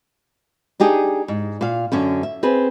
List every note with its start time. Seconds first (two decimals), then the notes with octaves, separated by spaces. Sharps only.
0.80 D4 D#4 G4 G#4
1.28 G#2
1.61 A#2 F5
1.92 F#2 D3 C#4
2.23 E5
2.43 C4 G#4 B4